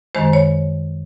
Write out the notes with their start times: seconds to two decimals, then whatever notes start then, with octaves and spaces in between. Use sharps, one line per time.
0.15 F#2 D#3 G#3 C5
0.33 C#5